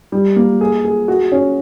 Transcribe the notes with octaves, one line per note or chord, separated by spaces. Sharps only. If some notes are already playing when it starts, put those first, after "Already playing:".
G3
A#3
G#4
G#4
F#4
C#4